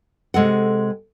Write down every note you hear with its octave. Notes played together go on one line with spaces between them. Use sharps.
C3 G#3 A4 F#5